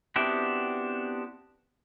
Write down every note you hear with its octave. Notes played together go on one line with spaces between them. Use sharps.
B3 C4 D4 E4 F#4 G4